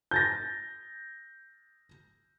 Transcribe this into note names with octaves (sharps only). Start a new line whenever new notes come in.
G6 A6 A#6